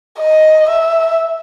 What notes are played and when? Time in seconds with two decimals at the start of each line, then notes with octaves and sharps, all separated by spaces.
0.19 D#5
0.69 E5